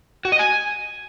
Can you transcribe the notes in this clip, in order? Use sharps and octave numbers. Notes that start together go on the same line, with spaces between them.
F#4
D#5
G#5